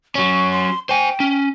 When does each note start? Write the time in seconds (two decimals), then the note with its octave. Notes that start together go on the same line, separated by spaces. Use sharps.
0.15 F#3 C#4 C#6
0.52 C6
0.89 C5 G5 G#5
1.20 C#4